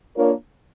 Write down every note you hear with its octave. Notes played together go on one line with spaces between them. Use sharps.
A#3 D4 F4 A#4 C#5